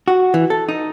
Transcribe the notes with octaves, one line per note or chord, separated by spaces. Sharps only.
F#4
E3
A4
D#4